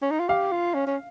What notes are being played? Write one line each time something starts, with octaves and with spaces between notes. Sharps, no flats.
C#4
D#4
F4
G4 F5
F4
C#4
C#4